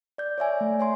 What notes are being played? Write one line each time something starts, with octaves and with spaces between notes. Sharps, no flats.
D5 G6
C#5 D5 E5 G#5
A3
C#5 G#5 C6